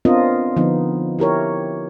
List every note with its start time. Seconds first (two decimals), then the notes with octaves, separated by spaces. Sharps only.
0.05 B3 C4 D4 F4 A#4 D#5
0.56 D3 F3 B3 D#4
1.19 E4 G4 A#4 C#5